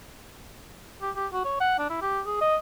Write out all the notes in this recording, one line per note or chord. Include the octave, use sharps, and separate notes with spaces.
G4
G4
F#4
C#5
F#5
D4
E4
G4
G#4
D#5